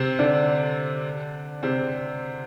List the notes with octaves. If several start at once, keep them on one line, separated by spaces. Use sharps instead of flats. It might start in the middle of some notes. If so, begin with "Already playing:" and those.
Already playing: C3 C4
D3 D4
C3 C4